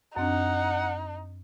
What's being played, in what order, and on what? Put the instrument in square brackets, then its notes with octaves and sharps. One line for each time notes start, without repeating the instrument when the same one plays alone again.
[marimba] F#2 C4 D4 [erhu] D#4 [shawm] F#5